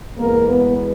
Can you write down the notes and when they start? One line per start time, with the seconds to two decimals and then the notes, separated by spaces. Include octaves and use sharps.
0.18 E2 B2 G#3 A#3 B3 A#4
0.47 B3 B4